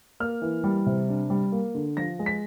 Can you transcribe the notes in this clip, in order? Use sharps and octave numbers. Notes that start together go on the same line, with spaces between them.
A#3 F6
E3
G3
C3
D4
G3
A#3
D3
F3 A#6
G#3
B6